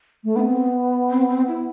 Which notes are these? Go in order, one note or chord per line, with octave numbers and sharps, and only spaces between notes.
A3
B3 C4 D4
C4
C4
E4